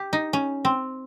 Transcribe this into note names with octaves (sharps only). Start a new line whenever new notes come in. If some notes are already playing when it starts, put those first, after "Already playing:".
Already playing: G4
D#4
C#4
C4